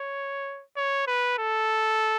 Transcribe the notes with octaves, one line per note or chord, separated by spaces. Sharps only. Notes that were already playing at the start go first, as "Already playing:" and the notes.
Already playing: C#5
C#5
B4
A4